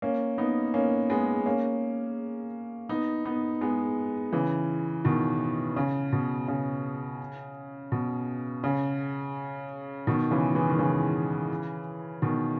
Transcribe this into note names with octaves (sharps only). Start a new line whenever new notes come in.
A#3 C#4
B3 D#4
A#3 C#4
G#3 B3
A#3 C#4
B3 D#4
B3 D#4
G#3 B3
C#3 E3
B2 D#3
C#3
B2
C#3
B2
C#3
B2 D#3
C#3 E3
E3 G#3
D#3
C#3 E3
B2 D#3